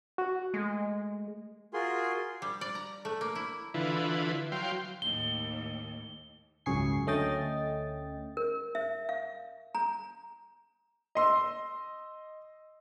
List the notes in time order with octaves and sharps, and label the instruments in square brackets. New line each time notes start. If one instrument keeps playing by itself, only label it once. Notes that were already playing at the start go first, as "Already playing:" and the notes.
[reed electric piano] F#4
[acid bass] G#3 [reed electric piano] A3
[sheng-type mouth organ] F4 F#4 G#4 A#4 G#5 C6
[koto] G3
D5
A#5
A3
A#3
E4
[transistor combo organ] D3 E3 E4 F4 B4
F#3 F5 G5 C6
[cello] D#2 A2 [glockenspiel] G7
[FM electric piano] G#1 C#2 F#2 G#4 C#6 C7
D2 A3 C#4 D#5 G5 A6
[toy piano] A#4
E5
F5
A#5
[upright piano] D#5 C6 E6